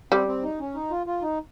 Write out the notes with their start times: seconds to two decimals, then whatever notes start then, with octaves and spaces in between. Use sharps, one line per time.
0.12 G3 C4
0.27 C4
0.43 D#4
0.60 C#4
0.75 D#4
0.91 F4
1.06 F4
1.22 D#4